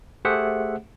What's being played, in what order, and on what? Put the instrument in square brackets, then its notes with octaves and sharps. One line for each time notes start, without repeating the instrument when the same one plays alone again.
[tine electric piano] A3 G4 G#4 C5 E5 F#5